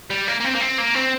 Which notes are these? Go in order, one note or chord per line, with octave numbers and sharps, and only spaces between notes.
G3
A#3
A#3
C4
A#3
C4
A#3
C4